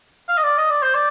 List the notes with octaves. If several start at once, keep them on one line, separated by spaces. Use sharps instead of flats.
F5
D#5
D5
D#5
D5
C5
D5